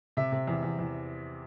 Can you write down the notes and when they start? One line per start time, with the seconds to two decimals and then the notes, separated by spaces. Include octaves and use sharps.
0.17 C3 E5
0.32 C3
0.48 E2
0.63 E2
0.79 E2